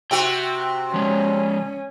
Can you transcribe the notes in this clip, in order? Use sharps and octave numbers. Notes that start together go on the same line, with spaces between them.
C3 C4 F#4 G5
F3 G#3 C#4